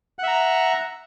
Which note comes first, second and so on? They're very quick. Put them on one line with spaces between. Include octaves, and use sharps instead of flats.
F#5 E5 A#5